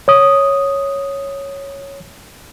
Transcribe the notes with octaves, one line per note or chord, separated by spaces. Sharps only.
C#5 D#6